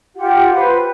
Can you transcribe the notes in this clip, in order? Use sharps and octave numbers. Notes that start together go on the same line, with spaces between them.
F4 G4 F#5
B4 C5